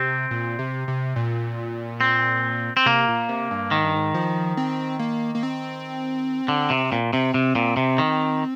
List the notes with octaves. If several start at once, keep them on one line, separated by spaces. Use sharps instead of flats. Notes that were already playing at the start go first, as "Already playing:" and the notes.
Already playing: C3 C4
A#2
C3
C3
A#2
C4
C4
C3 A#3
A#2
C3
G2
G#2 D#3
G2
G#2
F3
C4
A#3
A#3
C4
D3
C3
A#2
C3 C4
C3
A#2
C3
D#3